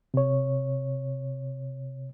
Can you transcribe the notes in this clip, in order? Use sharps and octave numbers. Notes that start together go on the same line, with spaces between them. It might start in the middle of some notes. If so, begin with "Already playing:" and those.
C3 C#5